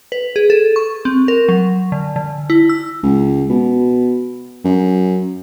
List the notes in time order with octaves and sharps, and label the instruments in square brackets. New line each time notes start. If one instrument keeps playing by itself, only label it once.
[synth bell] B4
G#4
A4
C#6
C4
A#4
F#3
D3
D3
E4
E6
[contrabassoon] C#2
B2
F#2